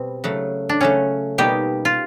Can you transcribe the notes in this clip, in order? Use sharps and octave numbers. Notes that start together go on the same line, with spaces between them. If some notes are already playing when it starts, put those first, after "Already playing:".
Already playing: B2 G3 C4
C#3 F#3 A3
D4
C#3 F#3 A3 C#4
B2 G3 A#3 D#4 G4
F4